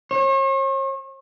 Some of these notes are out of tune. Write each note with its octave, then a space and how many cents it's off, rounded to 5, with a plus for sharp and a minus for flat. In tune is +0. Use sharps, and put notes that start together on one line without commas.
C#5 -45